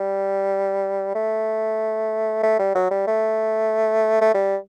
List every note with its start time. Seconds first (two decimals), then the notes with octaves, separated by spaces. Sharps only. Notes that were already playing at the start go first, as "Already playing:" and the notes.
Already playing: G3
1.15 A3
2.43 A3
2.59 G3
2.75 F#3
2.91 G3
3.07 A3
4.21 A3
4.34 G3